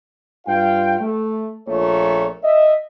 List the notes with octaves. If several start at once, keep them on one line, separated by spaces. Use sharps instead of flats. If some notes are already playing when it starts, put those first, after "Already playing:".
G2 F4 F5 G5
A3
A#1 A#2 A3 A#4 C#5
D#5 E5